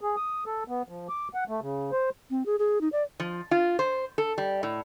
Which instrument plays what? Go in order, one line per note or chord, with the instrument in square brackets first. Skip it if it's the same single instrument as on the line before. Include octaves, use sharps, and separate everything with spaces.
[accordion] G#4
D#6
A4
B3
F3
D6
F#5
A3
C#3
C5
[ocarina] C4
G#4
G#4
D#4
D5
[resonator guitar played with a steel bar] F3
F4
C5
A4
G3
A2